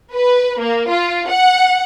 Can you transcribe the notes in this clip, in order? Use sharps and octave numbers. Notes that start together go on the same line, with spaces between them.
B4
A#3
F4
F#5